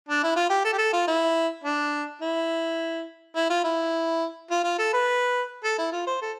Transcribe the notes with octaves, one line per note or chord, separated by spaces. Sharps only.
D4
E4
F4
G4
A4
G4
A4
F4
E4
D4
E4
E4
F4
E4
F4
F4
A4
B4
A4
E4
F4
C5
A4